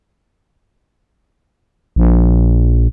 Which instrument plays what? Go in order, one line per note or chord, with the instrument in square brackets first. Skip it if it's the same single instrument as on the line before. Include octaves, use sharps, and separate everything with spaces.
[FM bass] A#1